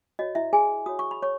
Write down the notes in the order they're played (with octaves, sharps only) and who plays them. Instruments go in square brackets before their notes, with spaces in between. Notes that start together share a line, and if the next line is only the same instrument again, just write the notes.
[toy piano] F#4 C#5 D#5
E4 E5
G#4 G#5
F#4 C#5 D#6
C#6
B5
C#5 C#6